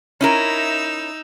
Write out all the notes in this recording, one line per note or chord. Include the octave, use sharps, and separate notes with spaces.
C#4 D#4 E4 A#4 E6